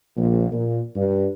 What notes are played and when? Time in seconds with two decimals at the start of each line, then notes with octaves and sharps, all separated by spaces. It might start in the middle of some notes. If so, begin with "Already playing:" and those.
0.17 A#1
0.51 A#2
0.96 G2